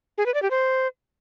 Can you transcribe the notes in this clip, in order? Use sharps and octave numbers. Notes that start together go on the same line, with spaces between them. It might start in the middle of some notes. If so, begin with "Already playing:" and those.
G#4
B4
D5
G4
C5